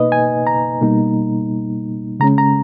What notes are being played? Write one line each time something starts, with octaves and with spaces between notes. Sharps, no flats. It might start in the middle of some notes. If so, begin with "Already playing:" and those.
Already playing: B2 A#3 D#4 B4 D#5
G#5
A#5
B2 G3 A#3 D#4
C#3 G#3 C#4 A#5
A#5